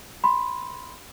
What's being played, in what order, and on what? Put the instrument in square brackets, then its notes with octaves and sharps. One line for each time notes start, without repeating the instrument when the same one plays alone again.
[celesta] B5 C6